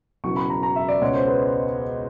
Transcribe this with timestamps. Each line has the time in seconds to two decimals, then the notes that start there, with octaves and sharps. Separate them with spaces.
0.24 E1 E2 C#3 F#3 C#6
0.36 B5
0.50 A#5
0.63 A#5
0.76 E5
0.88 D5
1.01 C#2 B2 G#3 C#5
1.14 C5
1.27 B4